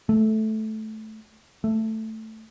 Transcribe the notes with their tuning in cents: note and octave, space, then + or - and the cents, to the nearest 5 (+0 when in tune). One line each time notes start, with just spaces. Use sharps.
A3 -10
A3 +5